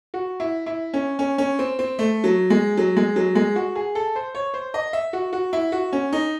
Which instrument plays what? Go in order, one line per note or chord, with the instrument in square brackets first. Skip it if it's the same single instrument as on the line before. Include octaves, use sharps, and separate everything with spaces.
[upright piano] F#4
E4
E4
C#4
C#4
C#4
C4
C4
A3
F#3
G#3
F#3
G#3
F#3
G#3
F#4
G#4
A4
C5
C#5
C5
D#5
E5
F#4
F#4
E4
F#4
C#4
D#4